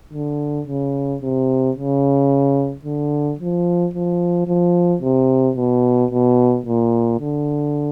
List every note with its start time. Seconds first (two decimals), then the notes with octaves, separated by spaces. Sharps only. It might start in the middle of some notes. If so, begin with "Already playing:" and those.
0.13 D3
0.67 C#3
1.22 C3
1.76 C#3
2.84 D3
3.39 F3
3.94 F3
4.47 F3
5.02 C3
5.57 B2
6.11 B2
6.66 A#2
7.19 D3